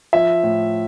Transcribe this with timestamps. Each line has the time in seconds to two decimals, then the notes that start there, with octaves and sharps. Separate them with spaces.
0.13 F3 E5
0.43 A2